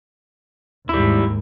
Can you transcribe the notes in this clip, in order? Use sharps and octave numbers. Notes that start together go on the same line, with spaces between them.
D#2 G#2 G3 E4